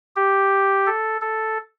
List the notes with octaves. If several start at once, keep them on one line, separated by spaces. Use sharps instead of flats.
G4
A4
A4